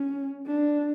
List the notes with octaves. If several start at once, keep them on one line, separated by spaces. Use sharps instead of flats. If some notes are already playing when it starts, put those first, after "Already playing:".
Already playing: C#4
D4